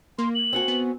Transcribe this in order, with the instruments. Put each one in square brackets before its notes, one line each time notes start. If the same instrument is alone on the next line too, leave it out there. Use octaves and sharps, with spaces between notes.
[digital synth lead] A#3 [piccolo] C6
[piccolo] F#7
[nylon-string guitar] C4 F#4 G#5
[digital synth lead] B3